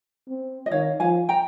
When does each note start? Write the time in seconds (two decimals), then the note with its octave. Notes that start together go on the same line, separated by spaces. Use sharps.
0.29 C4
0.66 D#5
0.71 D#3 C#5 F5
1.00 F3 F5 G#5
1.29 G5 A#5